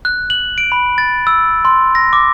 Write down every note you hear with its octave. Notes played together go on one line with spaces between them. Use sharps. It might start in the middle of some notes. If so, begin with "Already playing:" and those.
F#6
F#7
D7
B5
A6
E6
C6
A#6
D6